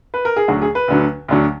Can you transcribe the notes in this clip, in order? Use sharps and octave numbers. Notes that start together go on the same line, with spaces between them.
B4
A#4
G#4
D2 D3 F#3 F#4
G#4
B4
D2 D3 F#3
D2 D3 F#3